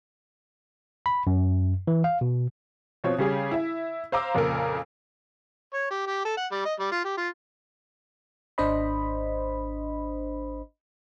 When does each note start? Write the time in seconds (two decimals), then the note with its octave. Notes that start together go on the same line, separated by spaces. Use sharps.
1.06 B5
1.27 F#2
1.87 E3
2.04 F5
2.21 B2
3.04 B2 F3 C4 C#5
3.18 C#3 G3 C#4 G4 G#4
3.51 E4 E5
4.12 C5 F5 A#5 D6 E6
4.34 F2 A#2 C#3 A4 A#4
5.74 C#5
5.91 G4
6.07 G4
6.25 A4
6.37 F#5
6.52 G3
6.65 D#5
6.79 G3
6.92 F4
7.05 G4
7.18 F4
8.58 G#1 D4 C5 D#5 B5